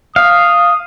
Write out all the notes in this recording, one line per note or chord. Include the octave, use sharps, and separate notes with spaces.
F5 D#6